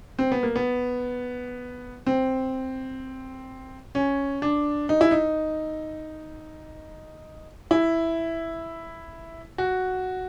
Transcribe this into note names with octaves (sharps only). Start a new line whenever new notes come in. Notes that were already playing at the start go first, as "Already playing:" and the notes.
C4
B3
A#3
B3
C4
C#4
D4
D#4
E4
D#4
E4
F#4